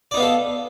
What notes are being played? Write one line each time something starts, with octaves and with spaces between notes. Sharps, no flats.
B3 D#4 A4 D5 F5